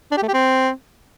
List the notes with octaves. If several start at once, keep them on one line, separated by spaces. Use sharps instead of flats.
D4
G4
A3
G4
C4